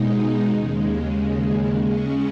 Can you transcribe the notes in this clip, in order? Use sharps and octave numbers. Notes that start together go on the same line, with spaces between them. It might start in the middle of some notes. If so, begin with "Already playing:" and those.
Already playing: B2 G#3 D#4
D#2 C#3 G#3
C#3 G#3 C#4